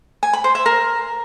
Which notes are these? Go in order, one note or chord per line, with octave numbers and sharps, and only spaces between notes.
G#5
B5
C5
E5
A#4